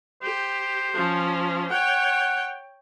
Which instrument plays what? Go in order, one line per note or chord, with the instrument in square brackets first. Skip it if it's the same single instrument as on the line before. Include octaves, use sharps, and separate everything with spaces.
[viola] G4 [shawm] C5
[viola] F3 C#4
[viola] C#5 G5 [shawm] F#5